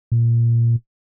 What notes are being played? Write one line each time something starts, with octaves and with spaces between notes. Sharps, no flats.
A#2